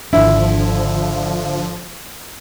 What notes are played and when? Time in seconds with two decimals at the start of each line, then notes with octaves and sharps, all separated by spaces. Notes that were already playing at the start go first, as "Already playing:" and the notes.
0.13 G#1 D3 F3 D4 E4